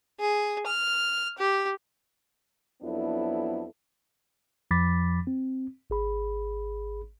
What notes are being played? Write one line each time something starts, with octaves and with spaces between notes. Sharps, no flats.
G#4
F6
G4
F2 F#3 B3 D4 E4 A4
F2 F3 B5 D6 A6 B6
C4
G#1 G#4 B5